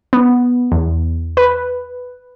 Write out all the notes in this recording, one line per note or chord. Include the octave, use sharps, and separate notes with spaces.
B3
E2
B4